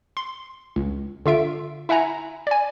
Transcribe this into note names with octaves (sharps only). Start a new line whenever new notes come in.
C6
C#2
D3 F4 E5 D7
E4 E5 F#5 G#5 A#5
D5 G#5